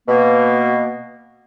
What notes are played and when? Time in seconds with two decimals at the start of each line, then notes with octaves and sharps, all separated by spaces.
0.08 B2 A#3